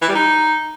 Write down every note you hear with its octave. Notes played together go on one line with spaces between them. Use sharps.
E3
G3
D#4